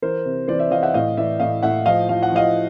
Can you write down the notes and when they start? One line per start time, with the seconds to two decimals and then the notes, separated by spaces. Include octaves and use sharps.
0.02 E3 A#4 C5
0.25 C3
0.48 E3 C5 D5
0.59 D5 E5
0.71 E3 D#5 F5
0.83 E5 F#5
0.94 A2 D#5 F5
1.17 E3 D5 E5
1.40 A2 D#5 F5
1.63 A2 E5 F#5
1.86 F3 D#5 F5
2.09 F3 F5
2.23 F#5
2.32 F3 D#5 F5